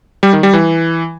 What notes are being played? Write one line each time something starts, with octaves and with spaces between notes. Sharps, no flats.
G3
D#3
G3
E3